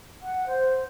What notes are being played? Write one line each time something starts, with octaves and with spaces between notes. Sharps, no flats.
F#5
C5